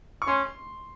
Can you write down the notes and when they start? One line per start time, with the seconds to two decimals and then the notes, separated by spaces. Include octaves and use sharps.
0.22 C#6
0.27 C#4 C6